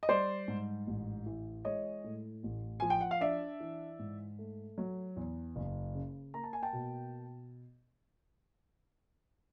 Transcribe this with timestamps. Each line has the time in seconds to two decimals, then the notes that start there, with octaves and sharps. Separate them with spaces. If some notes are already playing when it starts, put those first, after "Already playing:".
0.03 D#5
0.09 G3 C5 D5
0.48 G#2
0.87 A1
1.26 E3
1.65 G#3 C#5 D#5
2.04 A2
2.44 A1
2.80 F3 G#5
2.90 G5
3.01 F#5
3.11 F5
3.21 D4 D5 E5
3.60 E3
3.99 G#2
4.39 A3
4.78 F#3
5.17 E2
5.56 F#1
5.95 C#3
6.34 A#3 A#5
6.44 A5
6.53 G#5
6.62 G5 A5
6.73 B2